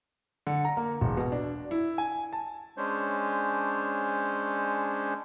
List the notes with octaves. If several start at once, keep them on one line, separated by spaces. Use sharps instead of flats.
D3
A#5
A#3
E1
B2
D4
E4
G#5
A5
G#3 C#4 D4 C5 C#5